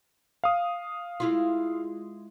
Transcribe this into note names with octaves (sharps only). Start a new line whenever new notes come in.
F5 D#6
G#3 E4 F4